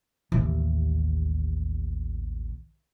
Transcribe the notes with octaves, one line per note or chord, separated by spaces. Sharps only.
A1 D#2